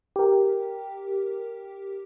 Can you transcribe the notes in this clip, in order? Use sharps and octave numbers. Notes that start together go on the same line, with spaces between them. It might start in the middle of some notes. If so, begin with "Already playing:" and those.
G4 A#4